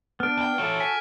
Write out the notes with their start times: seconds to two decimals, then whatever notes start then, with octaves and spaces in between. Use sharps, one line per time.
0.20 B3 D4 F6 D7
0.37 D2 G5
0.58 E3 F#4 A4 C#5
0.80 G#5 B6